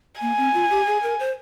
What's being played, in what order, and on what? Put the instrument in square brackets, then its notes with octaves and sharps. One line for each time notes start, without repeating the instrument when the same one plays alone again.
[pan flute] A#3 [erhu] G#5
[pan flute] C4
F4
G4
G#4
A#4
C5